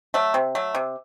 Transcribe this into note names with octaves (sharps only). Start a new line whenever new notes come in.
F#3 A3
C3
F#3 A3
C3